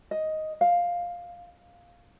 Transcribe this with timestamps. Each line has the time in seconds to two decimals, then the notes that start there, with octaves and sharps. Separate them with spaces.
0.11 D#5
0.61 F5